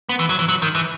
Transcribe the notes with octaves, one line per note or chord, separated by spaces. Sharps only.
B3
E3
F#3
E3
F#3
D#3
E3